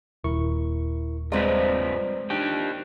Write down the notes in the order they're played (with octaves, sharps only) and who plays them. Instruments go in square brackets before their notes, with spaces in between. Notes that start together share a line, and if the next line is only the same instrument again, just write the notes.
[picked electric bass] D#1 [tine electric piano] E4 A#4 C#6
[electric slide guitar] G2 C4 B4 [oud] F3 F4 [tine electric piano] G#3 D5 A#5
[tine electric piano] D4 [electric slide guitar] D#4 G4 G5